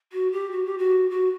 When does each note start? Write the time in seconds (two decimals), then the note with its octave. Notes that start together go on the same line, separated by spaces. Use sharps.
0.13 F#4
0.32 G4
0.51 F#4
0.65 G4
0.78 F#4
1.10 F#4